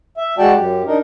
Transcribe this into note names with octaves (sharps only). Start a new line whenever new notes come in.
E5
G#3 F#4 D5 G5 A5
F#2 G4
D4 D#4 A#4